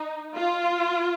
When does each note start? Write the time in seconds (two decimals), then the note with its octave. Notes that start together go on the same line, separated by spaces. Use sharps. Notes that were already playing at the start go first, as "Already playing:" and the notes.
Already playing: D#4
0.36 F4